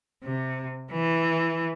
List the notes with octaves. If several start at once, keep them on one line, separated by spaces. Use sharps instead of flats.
C3
E3